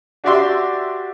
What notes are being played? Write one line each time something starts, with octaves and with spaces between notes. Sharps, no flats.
D4 F#4 G4 D5 E5 C6